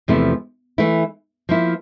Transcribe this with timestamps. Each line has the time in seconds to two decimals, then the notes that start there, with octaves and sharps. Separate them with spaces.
0.08 E2 C3 F3 A3 E4
0.78 E3 A3 E4
1.49 F3 A#3 E4